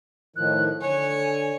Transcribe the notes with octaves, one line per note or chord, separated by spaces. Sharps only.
A2 D#3 F3 F#6
D3 C#5 G#5